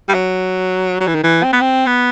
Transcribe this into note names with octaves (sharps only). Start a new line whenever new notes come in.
G3
F#3
F#3
E3
D#3
E3
C4
B3
C4
B3